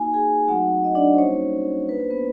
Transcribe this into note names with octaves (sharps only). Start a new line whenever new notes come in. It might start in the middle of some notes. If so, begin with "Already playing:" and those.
Already playing: A#3 D#4 F#4 G#5
G#4 G#5
F#3 A3 C4 D#4 F#4 F#5
D#5
D4 D5
C5
G3 A#3 C#4 D#4 F#4 C#5
A#3 D4 F4 B4
C5
B3 B4